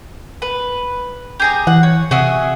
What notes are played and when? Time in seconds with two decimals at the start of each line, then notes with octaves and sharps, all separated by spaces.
0.42 B4
1.40 G4 G#4 A#5
1.67 E3 F#5
1.83 C#5
2.11 C3 F#4 G#4 E5